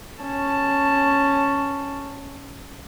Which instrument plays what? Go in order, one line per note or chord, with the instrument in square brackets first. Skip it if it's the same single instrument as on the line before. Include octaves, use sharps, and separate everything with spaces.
[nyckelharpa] C#4 A5